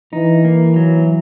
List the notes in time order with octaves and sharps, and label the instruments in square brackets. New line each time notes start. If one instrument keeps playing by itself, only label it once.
[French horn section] E3 [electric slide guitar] D#4
[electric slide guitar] A#3
F#3